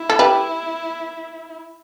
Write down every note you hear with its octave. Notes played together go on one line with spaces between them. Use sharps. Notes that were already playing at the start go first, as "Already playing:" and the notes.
Already playing: E4
A4
G4 B4